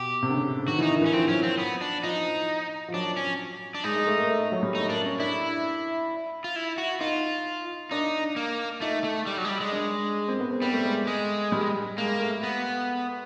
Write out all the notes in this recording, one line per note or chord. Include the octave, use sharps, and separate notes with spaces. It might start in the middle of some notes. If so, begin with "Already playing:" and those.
Already playing: B2 G4
C3
D3
C#3
C#3
D#3 F#4
E3 D#4
D3
E3 C#4
F3 C4
F#3 C#4
F3 C4
B3
D4
F3 D#4
F3
F#3 D4
C#4
D4
G#3 D#4
G#3
A3
A#3
A3
F#3
G3
A3 D#4
A#3 D4
C#4
D4 E4
F4
E4
F#4
D#4 F4
D4 D#4
A#3
A3 D#4
A3
G3
F#3
G#3
G3
G#3
D4
C4
B3
C4
G3 B3
A3
G#3
G#3
G3
G#3 A#3
A3
B3